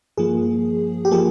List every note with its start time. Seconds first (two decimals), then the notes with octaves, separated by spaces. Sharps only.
0.18 G2 F3 A#3 G#4
1.05 G4
1.11 F3 A#3 G#4